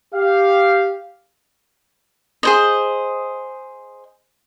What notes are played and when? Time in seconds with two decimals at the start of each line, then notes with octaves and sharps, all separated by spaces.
0.15 G4 F5
2.43 G#4 C5 D#5